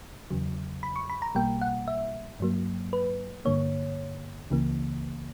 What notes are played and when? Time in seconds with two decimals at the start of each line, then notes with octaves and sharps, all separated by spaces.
0.30 E2 C#3 F#3
0.83 B5
0.96 C#6
1.10 B5
1.22 A#5
1.35 B1 B2 G3 A#3 G5
1.62 F#5
1.88 E5
2.40 G2 F#3 A#3
2.93 B4
3.45 G2 D3 A#3 C#5
4.50 C#2 C#3 E3 A#3